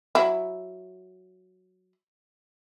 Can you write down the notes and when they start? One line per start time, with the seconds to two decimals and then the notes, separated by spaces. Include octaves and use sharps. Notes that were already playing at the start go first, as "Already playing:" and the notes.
0.15 F#3 E4